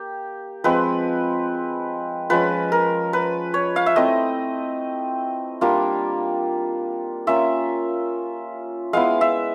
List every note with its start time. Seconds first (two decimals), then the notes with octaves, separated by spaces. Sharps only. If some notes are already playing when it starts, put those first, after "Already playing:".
Already playing: A#3 G4
0.64 F3 G#3 C4 B4
2.30 F3 G#3 C#4 B4
2.72 A#4
3.13 B4
3.54 C#5
3.76 F5
3.86 E5
3.96 A3 C4 E4 D#5
5.61 G3 A#3 D4 F4
7.27 A#3 C#4 F4 E5
8.93 G#3 B3 E4 F5
9.21 E5